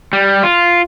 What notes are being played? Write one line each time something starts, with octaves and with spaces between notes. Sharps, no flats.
G3
F4